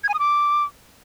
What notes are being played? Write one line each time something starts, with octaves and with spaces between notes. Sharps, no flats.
G#6
G#5
D#6
D6